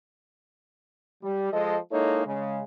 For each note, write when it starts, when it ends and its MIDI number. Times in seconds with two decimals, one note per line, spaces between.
1.23 1.52 55
1.53 1.77 53
1.53 1.77 56
1.53 1.77 69
1.53 1.77 75
1.92 2.23 56
1.92 2.23 58
1.92 2.23 63
1.92 2.23 64
1.92 2.23 69
1.92 2.23 73
2.26 2.64 49
2.26 2.64 56